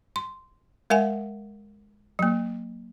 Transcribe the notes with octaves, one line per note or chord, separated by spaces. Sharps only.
C6
G#3 A#4 E5 F#5 G#5
F#3 A#3